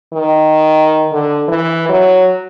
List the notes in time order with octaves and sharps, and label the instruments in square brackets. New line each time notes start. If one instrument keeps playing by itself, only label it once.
[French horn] D#3
D3
E3
F#3